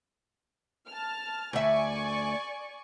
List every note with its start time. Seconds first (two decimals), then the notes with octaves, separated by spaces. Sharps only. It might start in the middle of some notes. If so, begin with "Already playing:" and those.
0.87 A5 F6
1.53 D2 D5 E5 G#5 C#6